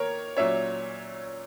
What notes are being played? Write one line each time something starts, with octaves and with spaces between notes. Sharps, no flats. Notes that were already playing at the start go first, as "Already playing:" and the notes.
Already playing: D#3 A#3 A#4 C#5
A#2 F#3 C#4 C#5 E5